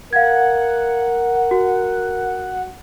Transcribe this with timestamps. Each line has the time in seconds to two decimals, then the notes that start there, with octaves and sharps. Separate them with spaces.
0.13 A#4 F5 F#5 G#6
1.51 F#4